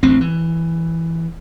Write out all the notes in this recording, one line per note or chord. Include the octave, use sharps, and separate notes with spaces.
A1 D2 C4
E3